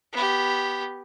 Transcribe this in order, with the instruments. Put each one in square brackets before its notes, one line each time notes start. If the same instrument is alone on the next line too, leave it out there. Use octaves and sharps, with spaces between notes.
[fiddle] B3 G4